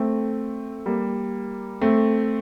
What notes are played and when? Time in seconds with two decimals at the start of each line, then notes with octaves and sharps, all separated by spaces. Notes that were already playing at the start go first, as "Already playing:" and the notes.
Already playing: A3 C4
0.86 G3 A#3
1.81 A3 C4